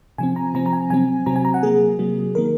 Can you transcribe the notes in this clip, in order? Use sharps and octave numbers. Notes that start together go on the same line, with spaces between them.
C3 F3 C4 G#5
A#5
C3 F3 C4 A#5
A#5
G#5
C3 F#3 C4 G#5
C3 F#3 C4 A#5
G#5
A#5
F#5
C3 F#3 A#3 G#4
C3 F#3 A#3
D#3 A#3 A#4